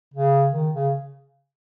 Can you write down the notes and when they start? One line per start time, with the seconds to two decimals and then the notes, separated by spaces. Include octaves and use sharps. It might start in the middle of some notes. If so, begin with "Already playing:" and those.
0.14 C#3
0.53 D#3
0.74 C#3